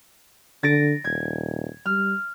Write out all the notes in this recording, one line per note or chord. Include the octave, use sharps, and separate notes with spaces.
D3 A6 A#6 D7
D#1 G#6
G3 F6